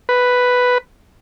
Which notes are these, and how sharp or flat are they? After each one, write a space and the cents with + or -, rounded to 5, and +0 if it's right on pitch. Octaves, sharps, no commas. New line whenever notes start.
B4 +5